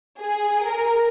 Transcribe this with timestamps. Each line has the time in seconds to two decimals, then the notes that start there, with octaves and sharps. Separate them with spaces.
0.19 G#4
0.65 A#4